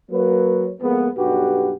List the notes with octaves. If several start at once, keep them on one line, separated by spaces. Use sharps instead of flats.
F#3 A#3 B4
F2 G#3 A#3 B3
B1 G2 G3 F#4 G4 B4